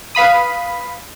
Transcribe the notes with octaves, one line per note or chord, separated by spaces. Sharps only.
B4 F5 B5 D#6